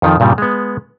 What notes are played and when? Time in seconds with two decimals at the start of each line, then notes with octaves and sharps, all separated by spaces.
0.02 F2 D#3 F3
0.20 G2 A#2 C#3 G3
0.38 G#3 B3